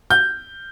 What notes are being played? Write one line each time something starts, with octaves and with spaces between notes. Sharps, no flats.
G6